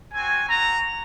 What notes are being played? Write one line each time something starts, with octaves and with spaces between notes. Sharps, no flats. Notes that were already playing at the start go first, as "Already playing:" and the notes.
C4 F#4 G#5
C4 F#4 A#5